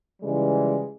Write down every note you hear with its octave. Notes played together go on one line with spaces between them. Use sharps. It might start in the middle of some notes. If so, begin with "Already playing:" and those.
C#3 E3 F3 G3 G#3